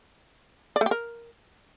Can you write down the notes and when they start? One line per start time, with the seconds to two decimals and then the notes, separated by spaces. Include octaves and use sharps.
0.76 D5
0.81 A3
0.86 G4
0.91 A#4